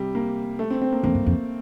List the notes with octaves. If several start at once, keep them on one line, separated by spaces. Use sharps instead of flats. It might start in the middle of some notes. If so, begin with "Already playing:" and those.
Already playing: C3 G3
A#3
A3
C4
C4
A#3
F2 A#3
G2
F2